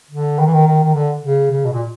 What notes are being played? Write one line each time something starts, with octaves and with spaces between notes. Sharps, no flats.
D3
D#3
E3
D#3
D#3
D#3
D3
C#3
C#3
B2
A#2